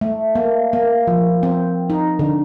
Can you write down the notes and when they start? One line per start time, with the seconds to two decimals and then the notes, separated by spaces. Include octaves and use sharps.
0.01 A3
0.35 A#3
0.73 A#3
1.07 F3
1.43 C4
1.90 D#4
2.19 D3